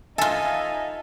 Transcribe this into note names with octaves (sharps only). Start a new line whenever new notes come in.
D#4 F4 A4 E5 G#5 A5